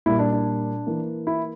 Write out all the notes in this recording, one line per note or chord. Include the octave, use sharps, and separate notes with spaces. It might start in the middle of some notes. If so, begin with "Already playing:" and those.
A#2 G3 A#3 E4
D4
D4
E3 A#3
E4